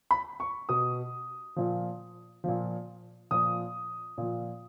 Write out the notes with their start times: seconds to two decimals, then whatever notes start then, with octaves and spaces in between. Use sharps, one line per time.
0.11 B5
0.40 C#6
0.69 B2 D#6
1.56 A#2 F3
2.44 A#2 F3
3.31 A#2 F3 D#6
4.18 A#2 F3